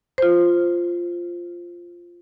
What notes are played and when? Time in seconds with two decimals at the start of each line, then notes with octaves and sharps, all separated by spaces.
0.18 F4 C5